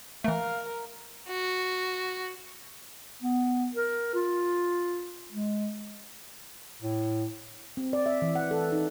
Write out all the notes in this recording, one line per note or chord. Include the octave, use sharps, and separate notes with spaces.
E3 A3 A#4 F5
F#4
B3
A#4
F4
G#3
A2
C4
D5
E5
E3
F#5
A4
D#4